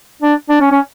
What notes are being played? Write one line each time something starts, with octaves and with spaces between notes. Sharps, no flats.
D4
D4
C#4
C#4